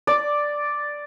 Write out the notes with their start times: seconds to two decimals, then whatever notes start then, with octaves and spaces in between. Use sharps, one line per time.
0.07 D5